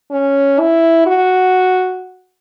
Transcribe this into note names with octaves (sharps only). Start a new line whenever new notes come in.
C#4
E4
F#4